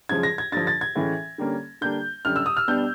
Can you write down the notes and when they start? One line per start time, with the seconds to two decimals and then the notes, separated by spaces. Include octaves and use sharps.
0.09 F#2 C#3 F3 G#3 G#6
0.23 A#6
0.38 G#6
0.52 G2 D3 F3 A6
0.67 A6
0.81 G#6
0.96 A2 E3 G#3 C#4
1.38 D3 G3 A#3 C#4
1.81 D3 G3 A#3 D4 G6
2.25 F#2 D3 G3 F6
2.36 E6
2.46 D#6
2.57 F6
2.68 B2 G3 B3 D4 G6